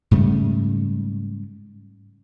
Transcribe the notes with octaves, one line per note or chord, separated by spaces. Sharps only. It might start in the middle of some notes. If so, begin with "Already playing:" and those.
G#2 C#3 G3 A3